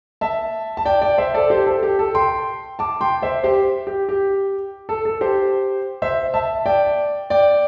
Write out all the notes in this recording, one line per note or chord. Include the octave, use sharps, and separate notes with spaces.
E5 A5
A5
D5 G5
D5 G5
C5 E5
A4 D5
G4 C5
A4
G4
A4
G5 C6
A5 D6
G5 C6
C5 E5
G4 C5
G4
G4
A4
A4
G4 C5
C5 E5
E5 A5
D5 G5
D5 G5